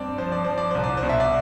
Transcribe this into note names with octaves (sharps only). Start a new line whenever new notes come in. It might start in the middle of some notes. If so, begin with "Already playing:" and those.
Already playing: G2 C4 D5
F3 C5
D5
F3 C5
D5
C2 C5
D5
C5
B2
E5
D5